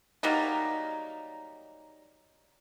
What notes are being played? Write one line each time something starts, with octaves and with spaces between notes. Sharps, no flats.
F#3 G3 A#3 D#4